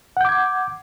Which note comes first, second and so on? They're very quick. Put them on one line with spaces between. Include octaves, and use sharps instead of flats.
F#5 G6 D6 G#6